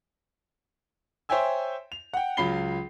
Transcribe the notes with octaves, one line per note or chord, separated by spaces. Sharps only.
C5 C#5 E5 G5 G#5 E6
F7
F#5 G5
C#2 F#3 F4 B5 C7 G7